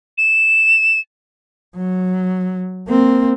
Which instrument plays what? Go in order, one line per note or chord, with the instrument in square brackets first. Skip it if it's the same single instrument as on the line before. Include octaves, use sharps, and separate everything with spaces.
[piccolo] E7
[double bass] F#3
A#3 C4